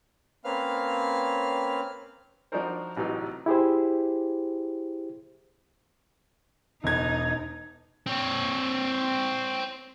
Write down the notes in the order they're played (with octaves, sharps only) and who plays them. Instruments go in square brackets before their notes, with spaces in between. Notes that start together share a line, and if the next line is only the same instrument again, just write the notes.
[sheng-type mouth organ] A#3 C4 C#4 B4 F5 F6
[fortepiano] F3 D4 D#4 F#4 A#4 C5
A1 C3 E3 F#3 D#4
[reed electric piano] E4 G4 G#4 C5
[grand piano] E1 G#6 [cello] D#4
[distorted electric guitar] C4 C#5